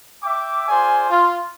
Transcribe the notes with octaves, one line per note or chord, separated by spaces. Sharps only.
E5 G5 D6
F4 G#4 C5 D5 G#5
F4